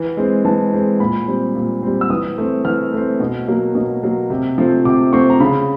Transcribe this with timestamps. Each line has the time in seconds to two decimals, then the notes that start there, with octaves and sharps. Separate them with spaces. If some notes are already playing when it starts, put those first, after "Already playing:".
Already playing: E3
0.17 G#3 C4
0.45 E3 A5
0.72 G#3 C4
1.00 A#2 B5
1.28 G3 C4
1.55 A#2
1.83 G3 C4
2.01 E6
2.10 E3 D#6
2.38 A3 C4
2.65 E3 F6
2.93 A3 C4
3.20 B2
3.48 F#3 A#3
3.75 B2
4.03 F#3 A#3
4.30 C3
4.58 F3 A3 C4
4.85 C3 D6
5.12 F3 A3 C4 C#6
5.30 A#5
5.40 C#3 B5